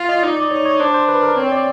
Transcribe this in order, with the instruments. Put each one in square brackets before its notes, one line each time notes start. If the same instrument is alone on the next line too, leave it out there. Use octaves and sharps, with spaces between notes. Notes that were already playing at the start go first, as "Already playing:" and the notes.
Already playing: [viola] F4
[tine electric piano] D#5
[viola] D#4 [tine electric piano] D5
[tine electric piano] D5
[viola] D#4 [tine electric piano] C#5
[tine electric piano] C#5
[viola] D4 [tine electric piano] C5
[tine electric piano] C5
B4
A#4
[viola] C4 [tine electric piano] C#5
[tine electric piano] D5